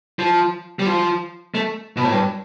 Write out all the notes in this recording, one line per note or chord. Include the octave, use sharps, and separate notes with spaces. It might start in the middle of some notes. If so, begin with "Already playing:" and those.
F3
G3
F3
A3
B2
A2
G2